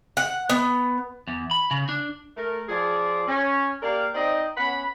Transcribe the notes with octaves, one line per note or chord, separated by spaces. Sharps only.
F#5
B3
E2
B5
C#3
D4
A3 A#4
F3 G#4 D5
C#4
A#3 G4 A#4 D5 F5
C4 D#4 C5 D5 D#5 G5
B3 C#4 F#5 B5